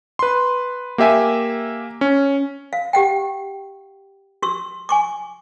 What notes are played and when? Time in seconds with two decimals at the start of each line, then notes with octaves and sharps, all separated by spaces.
0.19 B4 C6
0.98 A#3 G4 E5 G#5
2.01 C#4
2.73 F5
2.93 G4 F#5 G5
4.42 F#4 C#6 E6
4.89 G#5 C#6 D6